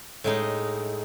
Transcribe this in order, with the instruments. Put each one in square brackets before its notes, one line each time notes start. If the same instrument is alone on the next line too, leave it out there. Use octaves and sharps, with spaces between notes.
[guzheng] A2 G#3 D#4